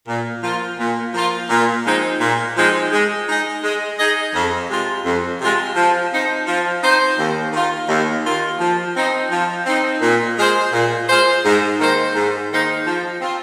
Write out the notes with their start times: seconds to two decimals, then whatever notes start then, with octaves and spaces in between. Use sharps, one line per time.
0.08 A#2
0.43 F3 A#3 F4
0.79 A#2
1.14 F3 A#3 F4
1.50 A#2
1.85 F3 G#3 C4 D#4
2.20 A#2
2.56 F3 G#3 C4 D#4
2.92 G#3
3.27 D#4 G#4 D#5
3.63 G#3
3.98 D#4 G#4 D#5
4.34 F2
4.69 C3 G#3 F4
5.05 F2
5.40 C3 G#3 F4
5.76 F3
6.11 C4 D#4 C5
6.47 F3
6.82 C4 D#4 C5
7.18 D#2
7.53 D#3 A#3 F4
7.89 D#2
8.25 D#3 A#3 F4
8.60 F3
8.95 C4 D#4
9.31 F3
9.66 C4 D#4
10.02 A#2
10.38 G#3 F4 G#4 C5
10.73 A#2
11.08 G#3 F4 G#4 C5
11.44 G#2
11.79 D#3 A#3 D#4 C5
12.15 G#2
12.51 D#3 A#3 D#4 C5
12.86 F3
13.22 C4 F4